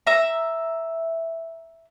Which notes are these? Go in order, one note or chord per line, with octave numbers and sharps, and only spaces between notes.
E5 A#5